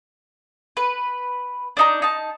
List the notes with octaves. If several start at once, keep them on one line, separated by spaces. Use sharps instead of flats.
B4
D4 D#4 A#5
D#4 A5